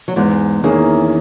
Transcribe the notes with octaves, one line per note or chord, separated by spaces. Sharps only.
F#3
E2 G#2 G#3
E2 D#3 E3 A#3 C#4 G#4